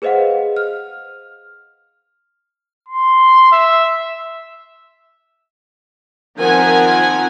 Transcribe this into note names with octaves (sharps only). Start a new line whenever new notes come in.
G#4 B4 C5 D#5 F5 F#5
F6
C6
E5
D#3 F3 C4 A#4 F#5 G#5